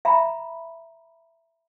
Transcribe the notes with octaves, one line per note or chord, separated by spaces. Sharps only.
E5 A#5 B5